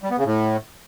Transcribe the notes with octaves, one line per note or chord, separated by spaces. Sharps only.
G3
B3
C#3
A2